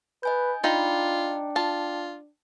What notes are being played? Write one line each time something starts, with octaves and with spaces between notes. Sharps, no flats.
B4 D#5 G#5 G6
D4 D#4 F4 G5 B5
F4 A5